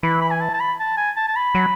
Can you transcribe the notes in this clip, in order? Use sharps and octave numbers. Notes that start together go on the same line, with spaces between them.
E3 B5
B5
G#5
A5
A5
B5
A5
G#5
A5
A5
B5
F#3